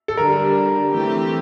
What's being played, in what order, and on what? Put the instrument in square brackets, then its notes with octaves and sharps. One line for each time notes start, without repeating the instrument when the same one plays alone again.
[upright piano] A4
[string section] D3 G3 D4 [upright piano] A#4
[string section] E3 A3 C4 G4